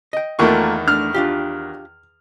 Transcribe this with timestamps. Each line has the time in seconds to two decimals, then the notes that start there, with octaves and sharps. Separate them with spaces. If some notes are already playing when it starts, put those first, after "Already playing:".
0.13 D#5 G5
0.39 E2 D#3 A3 A#3 F4 C#6
0.88 A3 D4 F6
1.14 D4 F4 G4